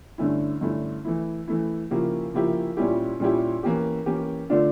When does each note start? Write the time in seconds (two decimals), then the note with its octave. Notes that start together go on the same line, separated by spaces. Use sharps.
0.18 G2 D3 A3 C#4 E4
0.61 G2 D3 A3 C#4 E4
1.05 E3 A3 E4
1.48 E3 A3 E4
1.91 C#3 F3 A#3 E4 G4
2.34 C#3 F3 A#3 E4 G4
2.77 A#2 G3 C#4 E4 G4
3.20 A#2 G3 C#4 E4 G4
3.63 E3 A#3 C#4 G4
4.06 E3 A#3 C#4 G4
4.50 D3 A3 D4 F4